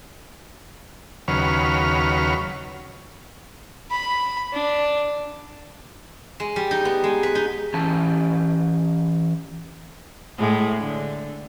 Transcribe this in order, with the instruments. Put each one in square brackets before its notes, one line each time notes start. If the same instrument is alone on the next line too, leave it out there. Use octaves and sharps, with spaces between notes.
[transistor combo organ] D#2 C#3 F#3 B4 C#5 F6
[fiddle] B5
D4
[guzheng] G#3
G3
D#4
B3
G#3
B4
D#4
[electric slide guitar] E3 C#4 G4 A5
[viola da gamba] A2 G#3
D3